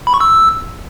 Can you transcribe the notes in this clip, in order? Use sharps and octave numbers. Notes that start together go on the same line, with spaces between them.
B5
C#6
E6